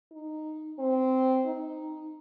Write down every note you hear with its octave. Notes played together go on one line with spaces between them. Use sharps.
D#4
C4
D#4